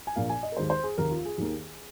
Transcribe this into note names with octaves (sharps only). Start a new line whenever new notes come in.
G#5
A#1 A#2 A#3 F5
G#5
D#5
A#4
D#2 D#3 G#3 C5
C5
G#4
F1 D#2 D#3 A#4
F4
G#4
D#2 D#3 A#3